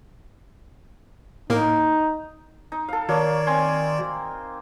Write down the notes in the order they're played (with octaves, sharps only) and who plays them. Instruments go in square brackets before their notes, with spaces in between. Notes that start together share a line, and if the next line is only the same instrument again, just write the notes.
[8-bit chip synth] A2 A#3 A#4 [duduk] D#4
[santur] D#4
A4 F5
[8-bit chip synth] D#3 F#4 D5 [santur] A#3 C#5
[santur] C4 G#5 C6